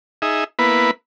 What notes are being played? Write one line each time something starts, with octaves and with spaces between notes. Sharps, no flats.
D#4 G#4 E5
A#3 B3 E4 B4